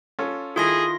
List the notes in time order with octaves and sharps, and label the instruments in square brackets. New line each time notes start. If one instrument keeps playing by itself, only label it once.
[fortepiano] C#4 F4 A4
[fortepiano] D#3 E4 A4 [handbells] F4 C6 A#6 [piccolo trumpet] G#4 [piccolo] D#6